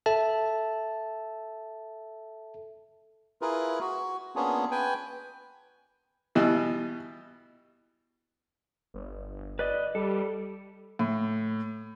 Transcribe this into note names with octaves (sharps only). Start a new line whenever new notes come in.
A4 E5 A5
E4 F4 G#4 A#4 B4
F#4
A#3 B3 C#4 D4 F4 G#4
B4 G5 G#5
B2 E3 G3
G1
B4 D5 D#5
G3 A4
A2